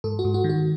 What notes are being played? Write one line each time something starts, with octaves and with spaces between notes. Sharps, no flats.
G#2 A4
F#4
G#2
F#4
D#3
F#4